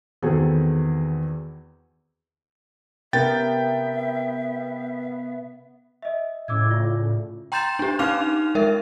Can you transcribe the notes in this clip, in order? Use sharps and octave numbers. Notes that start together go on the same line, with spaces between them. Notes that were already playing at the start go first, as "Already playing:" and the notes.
E2 D#3 C4 F#4 G#4 A4
C3 B3 C#4 A#4 E5 G5 A6
D#5 E5
A2 C#3 D6 E6 G#6
F4 D5
G5 A#5 C6 G6 A6 E7
D4 G4
C#4 D#4 F5 D6 F6 F7
G#3 A#4 E5